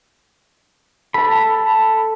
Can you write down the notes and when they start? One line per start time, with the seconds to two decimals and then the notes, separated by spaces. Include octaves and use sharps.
1.14 A4 A5 B5